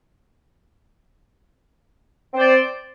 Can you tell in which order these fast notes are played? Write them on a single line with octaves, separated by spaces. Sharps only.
C4 C5 D5